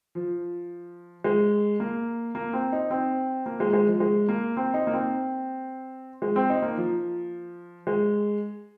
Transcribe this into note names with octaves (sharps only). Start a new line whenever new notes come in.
F3
G#3
A#3
A#3
C4
D#4
C4
A#3
G#3
G#3
F3
G#3
A#3
C4
D#4
A#3
C4
G#3
C4
D#4
A#3
F3
G#3